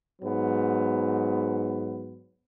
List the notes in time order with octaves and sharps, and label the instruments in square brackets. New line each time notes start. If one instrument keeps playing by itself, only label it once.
[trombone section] G#2 F#3 B3